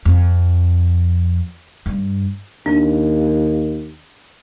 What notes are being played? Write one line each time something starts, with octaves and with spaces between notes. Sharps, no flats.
F2
G2
D#2 D4